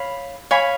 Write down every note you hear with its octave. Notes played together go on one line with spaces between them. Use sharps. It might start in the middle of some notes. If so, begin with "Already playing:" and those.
Already playing: C#5 F5 B5
C#5 F5 G#5 B5